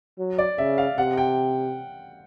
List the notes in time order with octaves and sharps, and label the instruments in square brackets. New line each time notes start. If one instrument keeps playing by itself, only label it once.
[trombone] F#3
[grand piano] D5
[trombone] C#3 [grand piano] E5
[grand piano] F5
[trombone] C3 [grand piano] F#5
[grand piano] G5